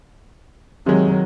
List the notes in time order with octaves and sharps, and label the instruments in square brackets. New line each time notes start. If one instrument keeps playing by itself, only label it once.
[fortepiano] C3 G#3 [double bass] D#3 F#3